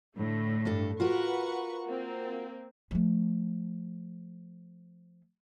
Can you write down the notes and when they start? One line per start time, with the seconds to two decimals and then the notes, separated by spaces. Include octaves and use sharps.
0.17 A2 D3 A3
0.65 G2 D4 A4
1.00 F4 F#4 A#4 B4 F#5 C#6
1.85 A#3 C4
2.91 F3 A3